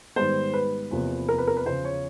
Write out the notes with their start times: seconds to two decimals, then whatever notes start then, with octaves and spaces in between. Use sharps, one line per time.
0.16 G#2 D#3 G3 B3 C5
0.54 B4
0.91 E2 C3 F3 A#3
1.29 A#4
1.38 B4
1.47 A#4
1.57 B4
1.66 E2 C#3 F3 C5
1.85 C#5